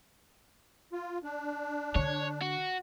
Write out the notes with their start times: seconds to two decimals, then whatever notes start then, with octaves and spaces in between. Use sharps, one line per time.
0.92 F4
1.23 D4
1.95 D3 C#5
2.42 F#4